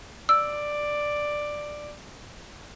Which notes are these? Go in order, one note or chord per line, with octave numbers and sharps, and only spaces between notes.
D5 E6